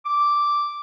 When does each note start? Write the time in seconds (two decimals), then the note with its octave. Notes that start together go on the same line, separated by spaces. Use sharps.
0.05 D6